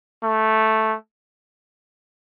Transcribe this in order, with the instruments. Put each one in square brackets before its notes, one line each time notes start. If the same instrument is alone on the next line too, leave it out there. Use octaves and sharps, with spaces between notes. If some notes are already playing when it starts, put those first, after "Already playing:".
[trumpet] A3